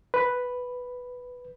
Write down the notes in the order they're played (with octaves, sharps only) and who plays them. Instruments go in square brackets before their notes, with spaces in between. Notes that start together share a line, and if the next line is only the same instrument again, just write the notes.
[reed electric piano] B4